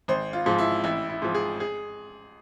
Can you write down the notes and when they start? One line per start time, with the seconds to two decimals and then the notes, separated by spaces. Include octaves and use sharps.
0.08 G#1 C5
0.33 F4
0.46 G#2 F3
0.58 E4
0.84 A1 E4
1.09 E4
1.22 G#2 F3
1.35 G#4
1.60 G#4